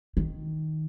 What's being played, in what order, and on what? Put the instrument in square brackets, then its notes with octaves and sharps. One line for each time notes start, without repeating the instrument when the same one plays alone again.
[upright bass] D#3